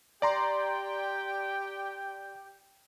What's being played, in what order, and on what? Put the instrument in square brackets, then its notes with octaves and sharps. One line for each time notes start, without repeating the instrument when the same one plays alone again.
[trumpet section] G4 G5 [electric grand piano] D5 A#5 C6